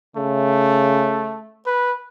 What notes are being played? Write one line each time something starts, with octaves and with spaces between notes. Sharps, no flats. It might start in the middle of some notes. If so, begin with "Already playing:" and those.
C#3 A3
B4